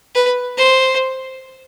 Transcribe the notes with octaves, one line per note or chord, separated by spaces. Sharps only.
B4
C5